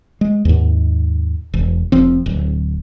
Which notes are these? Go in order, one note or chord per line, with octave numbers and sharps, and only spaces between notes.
G#3
D#2 G#2
E1
F1 F3 C4
D1